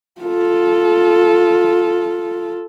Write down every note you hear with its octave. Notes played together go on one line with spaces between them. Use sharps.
F4 A4